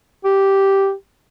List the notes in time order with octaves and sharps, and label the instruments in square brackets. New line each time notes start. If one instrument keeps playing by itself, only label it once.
[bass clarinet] G4